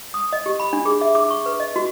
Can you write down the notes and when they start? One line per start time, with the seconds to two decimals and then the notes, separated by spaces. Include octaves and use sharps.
0.14 D#6
0.33 D#5
0.46 G4
0.60 B5
0.73 D4
0.86 G#4
1.01 E5
1.15 D6
1.31 C#6
1.46 B4
1.60 D#5
1.76 F#4